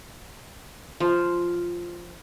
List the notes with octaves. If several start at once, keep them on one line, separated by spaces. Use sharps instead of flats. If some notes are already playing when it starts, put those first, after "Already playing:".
F3